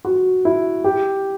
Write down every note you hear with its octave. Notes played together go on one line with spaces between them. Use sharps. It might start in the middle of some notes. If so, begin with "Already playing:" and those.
F#4
E4
G4